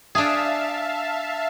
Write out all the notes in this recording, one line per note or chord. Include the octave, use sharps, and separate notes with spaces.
D4 G#4 E5 F5 A5